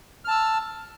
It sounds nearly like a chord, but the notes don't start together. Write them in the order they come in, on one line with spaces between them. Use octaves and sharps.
F6 A5 E6